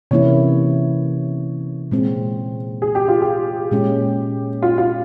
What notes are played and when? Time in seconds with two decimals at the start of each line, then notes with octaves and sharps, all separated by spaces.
0.11 C3 E3 A#3 C#4 E4 C#5
1.91 A#2 G#3 C4
2.82 G#4
2.95 G4
3.08 F4
3.22 G4
3.71 A#2 G#3 C#4
4.63 F4
4.78 F4